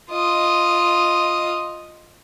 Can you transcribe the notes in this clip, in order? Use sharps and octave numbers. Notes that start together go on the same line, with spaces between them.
F4 D#5